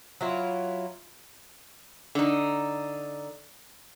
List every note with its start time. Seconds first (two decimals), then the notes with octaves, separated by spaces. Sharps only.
0.21 F#3 E4 F4
2.15 D3 D#4